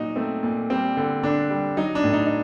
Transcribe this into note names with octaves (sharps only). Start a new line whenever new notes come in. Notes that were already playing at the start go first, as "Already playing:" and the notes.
Already playing: A#2 F#3 D#4 F#4
A3 C4
A#2
G3 C4
D3
D3 D4
G3
F#3 D#4
D4
A2
D#4
D#4